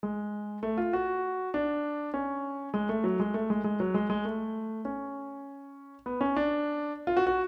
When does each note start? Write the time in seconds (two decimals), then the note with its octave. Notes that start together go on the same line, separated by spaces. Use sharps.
0.03 G#3
0.63 A3
0.78 F4
0.93 F#4
1.54 D4
2.14 C#4
2.74 G#3
2.89 A3
3.04 F#3
3.20 G#3
3.34 A3
3.50 G#3
3.64 G#3
3.80 F#3
3.94 G#3
4.10 G#3
4.25 A3
4.85 C#4
6.06 B3
6.21 C#4
6.36 D4
7.07 F4
7.17 F#4
7.27 F#4